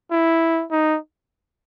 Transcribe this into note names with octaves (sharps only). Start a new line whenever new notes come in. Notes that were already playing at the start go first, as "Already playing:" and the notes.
E4
D#4